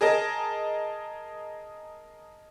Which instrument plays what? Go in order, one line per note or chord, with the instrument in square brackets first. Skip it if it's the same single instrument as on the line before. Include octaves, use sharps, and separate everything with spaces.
[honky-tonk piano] G#4 A#4 D#5 A5